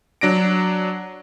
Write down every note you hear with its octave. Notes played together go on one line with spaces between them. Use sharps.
F#3 D4 A#6 D7